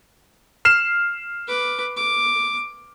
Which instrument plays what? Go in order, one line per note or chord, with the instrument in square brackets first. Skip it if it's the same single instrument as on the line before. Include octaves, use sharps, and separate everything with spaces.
[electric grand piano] F6 C7 E7
[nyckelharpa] B4 D6
D6